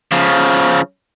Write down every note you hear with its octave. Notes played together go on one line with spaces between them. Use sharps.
C#3 F3